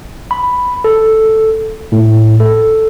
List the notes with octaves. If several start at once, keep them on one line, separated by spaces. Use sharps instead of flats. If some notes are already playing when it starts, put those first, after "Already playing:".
B5
A4
A2
A4